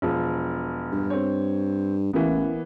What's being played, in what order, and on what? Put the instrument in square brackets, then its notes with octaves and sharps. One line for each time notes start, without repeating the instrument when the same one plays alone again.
[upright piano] E1 F3
[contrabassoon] G2
[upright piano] C4 C#5
[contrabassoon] A1 [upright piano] E3 A#3 B3